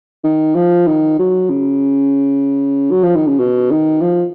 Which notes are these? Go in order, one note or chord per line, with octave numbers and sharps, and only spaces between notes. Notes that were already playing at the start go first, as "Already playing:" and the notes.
D#3
F3
D#3
F#3
C#3
F#3
F3
D#3
C#3
B2
D#3
F3